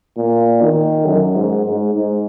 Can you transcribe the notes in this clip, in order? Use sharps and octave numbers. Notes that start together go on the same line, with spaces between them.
A#2
D#3
F#2
G#2
G#2
G#2